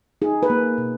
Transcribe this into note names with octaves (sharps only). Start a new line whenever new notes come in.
D#4 G#4
B4
A#3
B2